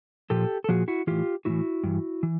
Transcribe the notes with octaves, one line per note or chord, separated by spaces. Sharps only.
A#2 F3 G4 A4
A4
A#2 F3 F#4 G#4
E4 F#4
A2 E3 F4 G4
A2 E3 E4 F#4
G2 E3
E3